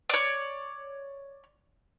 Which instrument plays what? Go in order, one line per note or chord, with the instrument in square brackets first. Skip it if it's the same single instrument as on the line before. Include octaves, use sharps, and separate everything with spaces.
[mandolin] C#5 D5